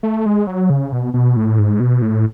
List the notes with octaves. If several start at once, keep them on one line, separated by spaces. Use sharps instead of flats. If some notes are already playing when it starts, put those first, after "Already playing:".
A3
G#3
F#3
C#3
B2
B2
A2
G#2
B2
A2